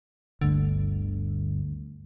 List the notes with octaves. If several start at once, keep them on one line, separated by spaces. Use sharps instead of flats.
G1 D2 D3